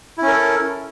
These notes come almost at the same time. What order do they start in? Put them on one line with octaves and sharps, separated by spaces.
E4 C#4 A#4 A4